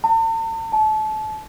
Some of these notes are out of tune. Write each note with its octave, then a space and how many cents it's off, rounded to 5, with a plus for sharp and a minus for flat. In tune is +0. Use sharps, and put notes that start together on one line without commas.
A5 +45
A5 -30